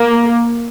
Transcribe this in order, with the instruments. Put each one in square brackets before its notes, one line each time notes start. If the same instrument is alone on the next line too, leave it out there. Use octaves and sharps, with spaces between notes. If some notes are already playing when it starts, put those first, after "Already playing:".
Already playing: [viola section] A#3